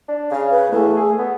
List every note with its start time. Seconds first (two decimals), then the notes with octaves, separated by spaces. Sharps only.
0.08 D4
0.31 C#3 F5
0.50 B4
0.71 E2 A3
0.96 G#4
1.19 B3